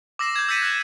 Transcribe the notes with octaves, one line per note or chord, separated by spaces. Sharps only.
D6 E6 A#6 C7 E7
G6 G#6
E6 G6 A6 B6 C#7 D#7
F#6